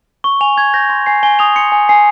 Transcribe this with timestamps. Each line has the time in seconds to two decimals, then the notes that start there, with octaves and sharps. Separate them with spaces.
0.24 C#6 G7
0.41 G#5 F7
0.57 G#5 G#6
0.74 G6 A#6
0.89 C6 A#6
1.06 G#5 C7
1.23 G#5 G7
1.39 D#6 F7
1.56 C6 C#7
1.72 G#5
1.89 G#5 C7